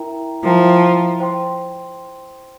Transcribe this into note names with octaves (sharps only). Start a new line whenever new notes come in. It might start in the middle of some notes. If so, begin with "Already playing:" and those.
Already playing: E4 A#4 E5 G5 A#5
F3 E4 A#4 E5 G5 A#5
C5 G5 C6